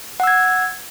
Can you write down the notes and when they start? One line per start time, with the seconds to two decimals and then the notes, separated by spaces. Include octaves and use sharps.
0.20 F#5
0.24 E6
0.27 G#6